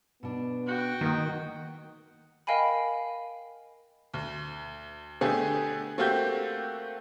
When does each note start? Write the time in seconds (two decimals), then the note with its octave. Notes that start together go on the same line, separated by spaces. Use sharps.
0.23 B2 B3 D4
0.67 F#4 G5
1.01 D#3 A#3 D#5
2.47 A#4 D#5 F5 G5 G#5 B5
4.14 D2
5.21 D3 A3 B3 G4 G#4
5.98 A3 A#3 C4 F#4 G4 G6